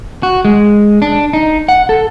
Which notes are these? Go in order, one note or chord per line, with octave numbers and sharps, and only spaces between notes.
F#4
G#3
D4
D#4
F#5
A4